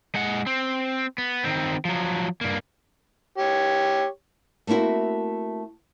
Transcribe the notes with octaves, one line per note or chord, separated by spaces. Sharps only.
G#3 F#5
C4
B3
D#3 C4
F3 F#3
G2 A#3
G4 C#5
A3 A#3 C4 E4 F#4